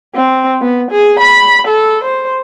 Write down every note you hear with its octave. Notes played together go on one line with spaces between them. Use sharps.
C4
B3
G#4
B5
A4
C5